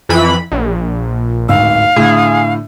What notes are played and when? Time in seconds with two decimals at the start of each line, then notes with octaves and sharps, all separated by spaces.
0.09 F2 E3 B5
0.52 A#1
1.49 D1 G#1 F5 E6
1.96 A2 D3 G#4